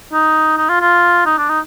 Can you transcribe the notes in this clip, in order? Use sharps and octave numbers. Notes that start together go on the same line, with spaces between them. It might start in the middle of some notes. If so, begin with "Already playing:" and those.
D#4
D#4
F4
F4
D#4
D4
D#4